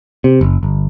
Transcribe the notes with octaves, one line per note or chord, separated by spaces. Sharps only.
C3
F#1
G1